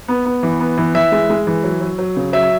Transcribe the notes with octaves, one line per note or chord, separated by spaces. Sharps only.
B3
B3
E3
B3
E3
E3 E5
G#3
G#3
E3
F#3
F#3
F#3
C#3
F#3 E5